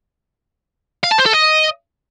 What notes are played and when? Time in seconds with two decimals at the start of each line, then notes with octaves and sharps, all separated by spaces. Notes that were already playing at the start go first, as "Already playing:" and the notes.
1.04 F5
1.11 A5
1.19 C5
1.26 A4
1.34 D#5